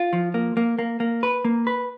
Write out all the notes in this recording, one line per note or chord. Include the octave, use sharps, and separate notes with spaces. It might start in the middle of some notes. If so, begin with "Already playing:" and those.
Already playing: F4
F3
A#3
A#3
A#3
A#3
B4
A#3
B4